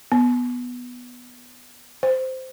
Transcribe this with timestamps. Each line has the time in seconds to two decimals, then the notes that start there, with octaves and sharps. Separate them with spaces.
0.12 B3
2.03 C5